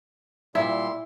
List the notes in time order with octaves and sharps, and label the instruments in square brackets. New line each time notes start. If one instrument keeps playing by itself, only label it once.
[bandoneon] A#2 G3 C6 [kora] E4